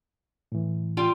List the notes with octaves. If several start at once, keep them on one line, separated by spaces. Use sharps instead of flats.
A2 E3
G3 F4 G5